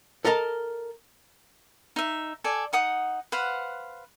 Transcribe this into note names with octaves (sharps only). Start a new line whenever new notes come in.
A4 A#4 D#5 A5 A#5
D#4 E5
A4 D5 G#5
D#4 F#5 D#6
B4 C5 F5 F#5